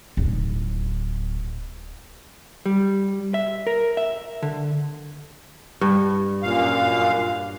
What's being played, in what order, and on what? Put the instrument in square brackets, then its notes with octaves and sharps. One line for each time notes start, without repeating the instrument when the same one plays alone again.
[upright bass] D1 D#4
[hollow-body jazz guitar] G3
E5
A#4
E5
D3
[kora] G2
[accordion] F#2 A#2 F5